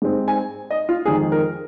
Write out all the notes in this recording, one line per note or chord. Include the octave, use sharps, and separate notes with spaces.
G#2 G#3 C4
G#5
D#5
F4
F2 D#3 G#3 D#4 G#4
A#4